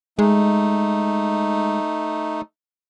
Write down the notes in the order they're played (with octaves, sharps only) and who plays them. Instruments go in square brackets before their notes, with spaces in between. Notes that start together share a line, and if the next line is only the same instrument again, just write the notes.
[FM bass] G#3 [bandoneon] A3 D#4